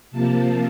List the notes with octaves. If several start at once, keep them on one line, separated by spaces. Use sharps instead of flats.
C3 F3 A#3 A5